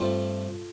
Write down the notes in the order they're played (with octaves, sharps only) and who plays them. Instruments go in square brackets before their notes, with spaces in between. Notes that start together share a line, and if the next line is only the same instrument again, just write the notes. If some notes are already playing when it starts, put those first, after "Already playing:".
Already playing: [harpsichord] G2 F3 A3 C4 F4 A4